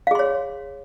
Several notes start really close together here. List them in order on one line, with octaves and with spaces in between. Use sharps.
F5 G#4 C6 C#5